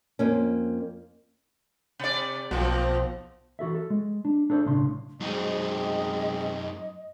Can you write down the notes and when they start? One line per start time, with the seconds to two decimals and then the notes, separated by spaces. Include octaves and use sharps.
0.19 F2 A#3 C#4
2.00 C3 D5
2.51 B1 A#2 F3 C4
3.59 E3 F#4 A4 E5
3.75 A4
3.90 G#3
4.25 D4
4.50 D4 A4 C5 D5
4.65 B1 A2 C#3 D4 C6
5.21 F#2 G#3 C4 D#4 D#5